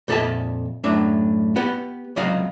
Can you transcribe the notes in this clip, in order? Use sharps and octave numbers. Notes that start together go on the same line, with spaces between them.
F2 A#2 A4 D#5 E5 A5
F#2 A2 D4 E5
B3 G4 B4 F#5
C#2 C3 F#3 D#5 F5